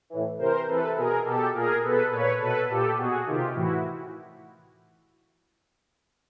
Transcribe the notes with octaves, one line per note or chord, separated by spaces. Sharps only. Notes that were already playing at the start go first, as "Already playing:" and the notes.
A2 E3
C3 E3 A#4 C5
C3 E3 A4 B4
B2 G#4 A#4
B2 G4 A4
A#2 G#4 A#4
B2 A4 B4
A#2 B4 C#5
B2 A4 B4
A#2 G4 A4
B2 F#4 G#4
C3 D#3 F4 G4
A2 E3 E4 F#4